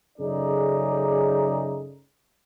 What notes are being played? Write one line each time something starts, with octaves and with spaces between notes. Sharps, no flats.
F#2 C#3 A3 D#4 G#4 D5